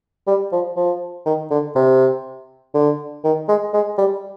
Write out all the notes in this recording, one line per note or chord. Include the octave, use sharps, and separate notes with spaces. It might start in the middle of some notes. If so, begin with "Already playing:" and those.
G3
F3
F3
D#3
D3
C3
D3
D#3
G#3
G#3
G3